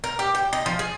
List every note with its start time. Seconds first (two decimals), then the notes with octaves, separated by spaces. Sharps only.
0.04 A#4
0.19 G4
0.35 G5
0.53 D#5
0.66 F3
0.79 G#4